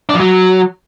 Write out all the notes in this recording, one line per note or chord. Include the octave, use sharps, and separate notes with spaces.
D4
F3
F#3